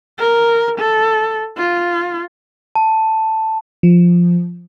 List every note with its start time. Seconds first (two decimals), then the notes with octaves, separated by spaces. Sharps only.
0.19 A#4
0.78 A4
1.57 F4
2.75 A5
3.83 F3